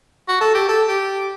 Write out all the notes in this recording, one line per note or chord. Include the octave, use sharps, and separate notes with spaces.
F#4
A4
G4
A4
G4